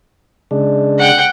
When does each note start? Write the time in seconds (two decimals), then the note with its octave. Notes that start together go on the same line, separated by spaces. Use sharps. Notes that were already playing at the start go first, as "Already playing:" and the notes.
0.51 C#3 G#3 D4
0.99 F#5 G5